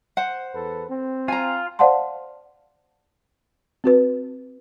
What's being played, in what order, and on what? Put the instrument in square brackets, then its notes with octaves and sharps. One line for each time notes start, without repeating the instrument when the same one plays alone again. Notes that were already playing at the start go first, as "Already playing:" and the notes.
[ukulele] C5 F#5
[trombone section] E2 A4 B4
C4
[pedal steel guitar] F4 [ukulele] G#5 A#5
[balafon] C5 D5 F5 F#5 A5 C6
C4 F#4 B4